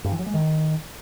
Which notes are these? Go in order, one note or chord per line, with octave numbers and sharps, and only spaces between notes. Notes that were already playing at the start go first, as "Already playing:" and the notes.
G2
E3
F#3
G#3
D#3